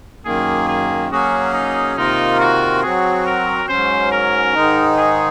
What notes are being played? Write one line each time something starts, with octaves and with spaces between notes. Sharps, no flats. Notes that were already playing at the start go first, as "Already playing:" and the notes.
F#2 D#3 A#3 G#4
G#4
F#3 A#3 C#4 F#4 G#4
D#4
C3 D#3 A#3 D#4 F4 A#4
F#4
F#3 C4 F#4 G#4
A#4
G#2 F#3 C#4 C5
A#4
G#2 D#3 G#3 D#4
G#4